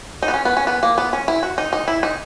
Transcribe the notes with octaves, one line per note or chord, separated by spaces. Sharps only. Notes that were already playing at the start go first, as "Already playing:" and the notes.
D#4
B3
C#4
B3
C#4
B3
A#3
B3
C#4
E4
F#4
D#4
D#4
E4
D#4